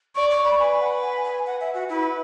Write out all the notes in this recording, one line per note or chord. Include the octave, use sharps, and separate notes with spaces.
D5 C#6
C#6
B5
B4 G#5
F#5
G#5
G#5
F#5
E5
F#4
E4 B4